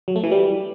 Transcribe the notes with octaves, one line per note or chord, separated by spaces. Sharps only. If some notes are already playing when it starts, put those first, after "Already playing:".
F#3
A3
E3
G3